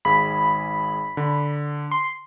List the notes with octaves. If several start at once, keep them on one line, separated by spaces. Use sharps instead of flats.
G#1 G#4 F5 B5
D3
C6